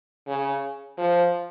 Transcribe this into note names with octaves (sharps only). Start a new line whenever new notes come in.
C#3
F3